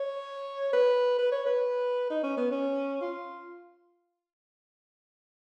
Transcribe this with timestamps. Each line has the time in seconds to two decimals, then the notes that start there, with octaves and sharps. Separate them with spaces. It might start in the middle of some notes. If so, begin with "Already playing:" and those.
Already playing: C#5
0.73 B4
1.18 B4
1.32 C#5
1.46 B4
2.10 D#4
2.23 C#4
2.37 B3
2.51 C#4
3.01 F4